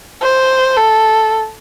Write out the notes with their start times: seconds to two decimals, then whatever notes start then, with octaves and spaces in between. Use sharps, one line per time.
0.22 C5
0.77 A4